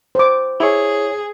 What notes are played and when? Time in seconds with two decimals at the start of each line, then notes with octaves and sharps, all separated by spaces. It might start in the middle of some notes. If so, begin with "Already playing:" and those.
0.15 C5 D6
0.60 E4 G#4 C#5